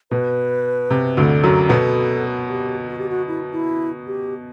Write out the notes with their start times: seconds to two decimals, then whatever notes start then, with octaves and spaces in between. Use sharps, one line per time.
0.11 B2 B4
0.90 C3
1.17 D2 D3
1.43 F#2 F#3
1.69 B2 B3 A4
2.49 G4
2.88 F#4
2.99 G4
3.09 F#4
3.28 E4
3.53 E4
4.07 G4